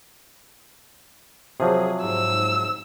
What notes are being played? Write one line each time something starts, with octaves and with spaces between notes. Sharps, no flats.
C3 F3 F#3 G#4
G#2 E6